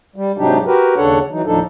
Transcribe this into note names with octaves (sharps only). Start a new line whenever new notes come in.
G3
G#2 C3 F#3 D4 D#4 G4
F#4 G4 A#4 B4
D#2 C#3 D4 A4 C#5 F#5
E3 F#3 D#4
D#2 A2 F3 D4 D#4 A4